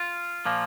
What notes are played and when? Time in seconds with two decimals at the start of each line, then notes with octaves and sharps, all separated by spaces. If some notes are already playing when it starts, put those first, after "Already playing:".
Already playing: F4
0.46 A#2 F3 A#3